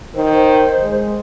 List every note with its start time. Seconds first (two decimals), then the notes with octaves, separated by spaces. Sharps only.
0.15 D#3 C5
0.81 G#3